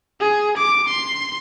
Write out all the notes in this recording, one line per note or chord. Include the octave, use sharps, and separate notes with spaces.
G#4
D6
C6